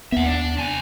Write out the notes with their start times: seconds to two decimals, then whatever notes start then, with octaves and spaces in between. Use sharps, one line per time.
0.12 D#2 B3 E5 F#5
0.26 D4 D5
0.57 C2 G#5